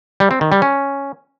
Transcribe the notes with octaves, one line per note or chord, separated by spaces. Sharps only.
G3
C4
D#3
G3
C#4